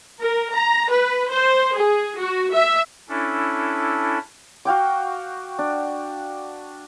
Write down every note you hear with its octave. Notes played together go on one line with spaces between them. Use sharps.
A#4
A#5
B4
C5
G#4
F#4
E5
C#4 D4 E4 A4
F#4 F5 G5 D6
D4